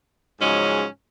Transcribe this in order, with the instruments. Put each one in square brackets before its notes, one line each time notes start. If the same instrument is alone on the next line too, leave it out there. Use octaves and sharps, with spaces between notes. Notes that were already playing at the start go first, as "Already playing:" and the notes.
[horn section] G#2 C#3 F3 F#3 G#3 C#4